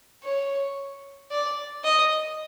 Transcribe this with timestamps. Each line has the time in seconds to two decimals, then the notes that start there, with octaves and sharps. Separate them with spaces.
0.24 C#5
1.31 D5
1.84 D#5